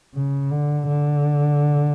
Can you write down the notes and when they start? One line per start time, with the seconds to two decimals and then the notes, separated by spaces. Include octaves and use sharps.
0.14 C#3
0.51 D3
0.87 D3